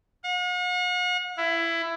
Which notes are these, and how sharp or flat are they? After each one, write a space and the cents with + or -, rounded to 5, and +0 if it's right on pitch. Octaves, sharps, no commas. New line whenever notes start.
F#5 -45
E4 +15